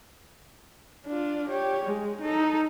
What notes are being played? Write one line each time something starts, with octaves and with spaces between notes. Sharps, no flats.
D4 F4
G4 C#5
G#3
D#4 A4